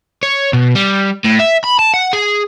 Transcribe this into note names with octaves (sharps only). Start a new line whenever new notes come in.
C#5
B2
G3
A2
E5
B5
A5
F#5
G#4